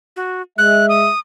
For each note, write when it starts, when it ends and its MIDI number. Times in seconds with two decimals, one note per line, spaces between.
0.16 0.42 66
0.58 1.09 56
0.58 1.09 76
0.58 0.86 90
0.89 1.19 87